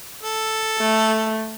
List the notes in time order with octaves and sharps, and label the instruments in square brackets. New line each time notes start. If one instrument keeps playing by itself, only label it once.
[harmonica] A4
[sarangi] A3